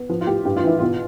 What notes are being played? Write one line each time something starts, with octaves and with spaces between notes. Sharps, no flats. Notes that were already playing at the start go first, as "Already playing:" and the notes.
Already playing: B3
F3 B4
F4
A2 G4
G2 G4
F4
E3 E4
B2 F4